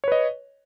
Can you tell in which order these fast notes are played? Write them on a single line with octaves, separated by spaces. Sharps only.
C#5 B4 D#5